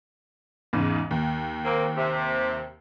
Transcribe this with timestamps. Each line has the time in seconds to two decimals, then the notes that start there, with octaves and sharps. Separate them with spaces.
0.73 E2 G#2 C#3
1.11 D#2
1.64 A#3 C4
1.97 C3